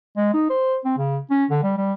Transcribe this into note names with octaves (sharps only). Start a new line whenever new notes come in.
G#3
D#4
C5
C4
C#3
C#4
D3
G3
G3